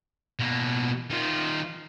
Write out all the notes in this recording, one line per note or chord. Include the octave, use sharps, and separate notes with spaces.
B2 A#3
D#3 F4